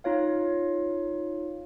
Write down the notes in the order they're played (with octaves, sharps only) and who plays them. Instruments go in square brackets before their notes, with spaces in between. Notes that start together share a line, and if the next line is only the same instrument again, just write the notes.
[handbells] D#4 F4 C#5 F5